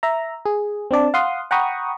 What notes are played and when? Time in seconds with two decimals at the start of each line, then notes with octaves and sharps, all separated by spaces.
0.03 E5 A#5
0.46 G#4
0.91 C4 D4 D5 A5
1.14 F5 F#5 C6 D#6
1.51 F#5 G5 A#5 B5 C#6 D#6